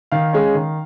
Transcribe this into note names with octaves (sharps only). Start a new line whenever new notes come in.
D#3 F5
G#3 C#4
D#3